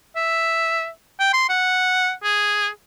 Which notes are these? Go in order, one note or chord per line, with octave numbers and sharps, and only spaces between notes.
E5
G5
C6
F#5
G#4